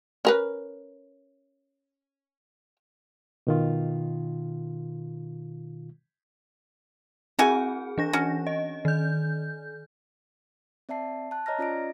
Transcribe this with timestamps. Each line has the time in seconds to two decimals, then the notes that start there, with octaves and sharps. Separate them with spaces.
0.25 C#4 A#4 B4
3.47 B2 D#3 F4
7.39 C4 E4 F#4 G#4 G#5
7.98 E3 D4 A#6
8.13 C#4 F#4
8.47 D#5
8.85 D#3 G6
10.89 C4 D5 E5 A5 C7
11.31 A5 F#6
11.46 C#5 D#5 A#5 F6 A#6
11.58 C#4 F4 D5 D#5 A#6 D7